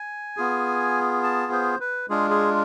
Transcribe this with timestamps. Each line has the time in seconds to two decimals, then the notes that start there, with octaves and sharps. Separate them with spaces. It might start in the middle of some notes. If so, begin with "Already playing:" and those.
Already playing: G#5
0.37 B3 F4 G#4
1.23 A5
1.52 C5
1.80 B4
2.09 G#3 D4 F4 G#4
2.30 G#4